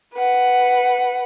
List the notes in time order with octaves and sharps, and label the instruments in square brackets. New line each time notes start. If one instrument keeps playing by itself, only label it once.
[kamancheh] B4 F#5